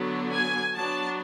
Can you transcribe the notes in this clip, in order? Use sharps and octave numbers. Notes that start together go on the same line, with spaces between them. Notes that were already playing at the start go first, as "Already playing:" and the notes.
Already playing: D3 F#3 B3 D4
G#5
F#3 B3 D4 A5